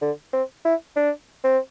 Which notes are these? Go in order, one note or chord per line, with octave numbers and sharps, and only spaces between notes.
D3
C4
E4
D4
C4